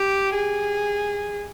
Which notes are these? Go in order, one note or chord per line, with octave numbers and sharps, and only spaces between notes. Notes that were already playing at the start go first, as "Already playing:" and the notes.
Already playing: G4
G#4